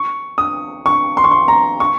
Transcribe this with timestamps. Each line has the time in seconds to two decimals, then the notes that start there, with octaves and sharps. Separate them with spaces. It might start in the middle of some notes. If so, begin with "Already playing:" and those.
Already playing: C#6
0.38 D#6
0.86 C#6
1.17 C6
1.24 C#6
1.31 C6
1.48 A#5
1.80 C#6